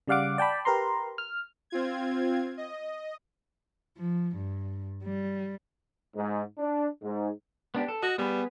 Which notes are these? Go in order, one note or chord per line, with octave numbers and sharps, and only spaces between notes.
C#3 G3 D5 F5 F#5 D6
D5 G5 A5 B5
G4 A#4 B4 A#5 C6
F6
C4 F4 G#6
D#5
F3
G2
G3
G#2
D4
G#2
B3 D4 G4
A4
F#4 D#5
G3 B3 G#4 B4